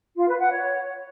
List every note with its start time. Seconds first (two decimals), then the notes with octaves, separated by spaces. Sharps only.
0.16 F4
0.28 B4
0.39 F#5
0.51 C#5